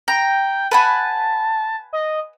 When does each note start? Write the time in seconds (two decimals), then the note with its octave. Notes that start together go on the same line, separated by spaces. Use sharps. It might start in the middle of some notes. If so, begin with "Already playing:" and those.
0.08 G5 A#5
0.71 B4 F#5 G#5 A5
1.93 D#5